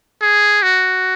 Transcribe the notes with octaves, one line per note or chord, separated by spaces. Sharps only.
G#4
F#4